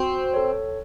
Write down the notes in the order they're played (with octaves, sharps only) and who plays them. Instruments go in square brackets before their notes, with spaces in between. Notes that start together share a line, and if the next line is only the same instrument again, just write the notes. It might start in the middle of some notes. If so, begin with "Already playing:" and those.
Already playing: [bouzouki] C4 [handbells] F#4
[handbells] A4 C#5